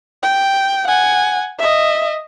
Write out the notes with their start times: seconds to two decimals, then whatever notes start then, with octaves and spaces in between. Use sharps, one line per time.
0.23 G5
0.88 F#5 G#5
1.59 D#5 E5